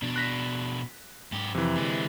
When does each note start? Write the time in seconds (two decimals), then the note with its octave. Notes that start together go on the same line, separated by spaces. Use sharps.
0.02 B2 D4
0.16 F#6 A#6 B6
1.32 G#2 G4
1.55 F2 C3 E3
1.77 D3 G#3